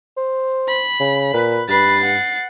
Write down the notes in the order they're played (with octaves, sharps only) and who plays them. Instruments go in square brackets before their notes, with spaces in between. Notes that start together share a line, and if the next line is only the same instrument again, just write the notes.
[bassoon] C5
[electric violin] B5
[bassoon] C#3
[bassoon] A#2 [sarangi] B4
[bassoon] G2 [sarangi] B4 [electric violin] A6 C7
[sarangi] F#5